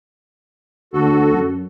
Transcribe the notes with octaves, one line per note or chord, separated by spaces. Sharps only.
D2 F#4 A4
F#2